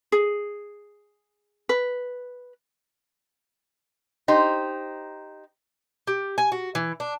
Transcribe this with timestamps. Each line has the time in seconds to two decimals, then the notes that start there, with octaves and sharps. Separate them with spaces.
0.12 G#4
1.69 B4
4.28 D#4 G4 C5
6.07 G4
6.38 G#5
6.52 F#4
6.75 E3
7.00 D4